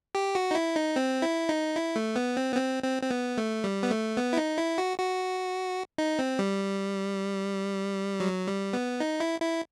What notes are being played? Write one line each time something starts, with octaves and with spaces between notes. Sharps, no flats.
G4
F#4
D#4
E4
D#4
C4
E4
D#4
E4
A3
B3
C4
B3
C4
C4
C4
B3
A3
G3
B3
A3
B3
E4
D#4
E4
F#4
F#4
D#4
C4
G3
F#3
G3
B3
D#4
E4
E4